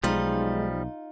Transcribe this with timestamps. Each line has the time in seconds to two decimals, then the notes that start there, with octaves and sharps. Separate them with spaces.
0.04 B1 F3 G3 G#3 D#4 F4 D#5